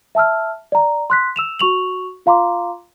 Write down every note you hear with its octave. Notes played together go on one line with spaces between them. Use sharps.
E5 A5 E6 F6
D5 A#5
C6 F#6 B6
E6 E7 F7
F#4 C#6 F7 F#7
F4 F5 A#5 C6 D6